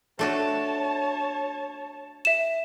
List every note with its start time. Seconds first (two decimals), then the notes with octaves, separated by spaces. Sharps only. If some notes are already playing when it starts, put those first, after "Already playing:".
0.19 A3 D4 F#4 C#5 A5
2.25 E5 E7